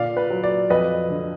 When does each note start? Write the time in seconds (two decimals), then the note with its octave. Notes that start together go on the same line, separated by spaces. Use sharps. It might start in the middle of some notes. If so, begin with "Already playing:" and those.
Already playing: A#2 D3 D5 F5
0.17 B4
0.30 F#3
0.44 D5
0.70 F2 B4 D#5
1.10 D3